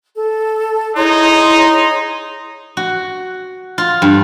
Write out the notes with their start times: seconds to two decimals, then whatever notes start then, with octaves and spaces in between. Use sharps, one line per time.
0.15 A4
0.96 D#4 E4 G#4 C#5 C6
2.77 F#4
3.78 F4
4.02 G2